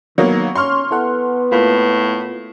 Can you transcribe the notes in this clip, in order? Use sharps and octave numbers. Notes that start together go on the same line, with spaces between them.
D#3 F#3 A#3 B3
C#4 C6 C#6 F6
B3 E4 A4 F#5
A2 A#3 F4 B4